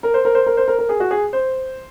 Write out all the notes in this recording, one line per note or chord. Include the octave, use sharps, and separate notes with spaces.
A#4
C5
A#4
C5
A#4
C5
A#4
A#4
G#4
F#4
G#4
C5